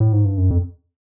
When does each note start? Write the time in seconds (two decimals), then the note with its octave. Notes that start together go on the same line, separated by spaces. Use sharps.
0.00 A2
0.13 G#2
0.25 G2
0.37 F#2
0.50 F2